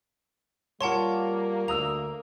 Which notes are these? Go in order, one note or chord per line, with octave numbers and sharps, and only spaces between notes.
G3 A#3 F4 C#5 F#5 A5 C6
D2 A#5 D#6 E6 F7